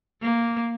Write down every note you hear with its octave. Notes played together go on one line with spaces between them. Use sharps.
A#3